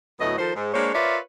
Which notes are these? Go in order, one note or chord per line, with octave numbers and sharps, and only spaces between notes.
D2 A2 F#3 A3 B3 D#5
D#3 F3 A4 C5
G#2
G#3 A#3 D4 C5 C#5
F4 A#4 B4 C#5 D5 E5